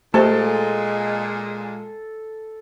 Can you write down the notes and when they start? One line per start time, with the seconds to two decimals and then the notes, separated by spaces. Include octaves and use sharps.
0.14 A#2 G#3 A3 G4 A4 C5